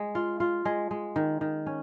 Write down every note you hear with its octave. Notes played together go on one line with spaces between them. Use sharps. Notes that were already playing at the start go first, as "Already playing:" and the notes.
Already playing: G#3
F4
F4
G#3
G#3
D#3
D#3
C#4